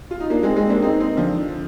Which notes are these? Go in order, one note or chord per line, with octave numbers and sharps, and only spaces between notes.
F4
D#4
A#3 D4
G#3 C4
G#3 C4
A#3 D4
C4 D#4
C4 D#4
D3 F3